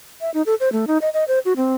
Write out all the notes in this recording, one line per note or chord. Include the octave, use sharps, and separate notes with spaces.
E5
D#4
A4
C5
A3
D#4
D#5
D#5
C5
F#4
C4